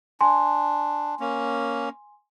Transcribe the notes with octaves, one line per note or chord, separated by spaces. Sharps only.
D4 G#5 C6
A#3 C#4